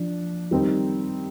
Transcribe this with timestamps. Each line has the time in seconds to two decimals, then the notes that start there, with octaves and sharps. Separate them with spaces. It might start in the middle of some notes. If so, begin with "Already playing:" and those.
Already playing: F3 D4
0.51 D#3 G3 C4 D#4